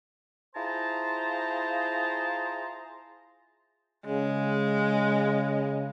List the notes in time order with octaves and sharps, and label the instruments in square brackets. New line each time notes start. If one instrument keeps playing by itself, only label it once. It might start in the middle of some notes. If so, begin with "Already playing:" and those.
[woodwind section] E4 F4 G#4 C5 A5 A#5
[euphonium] C#3 [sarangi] G#3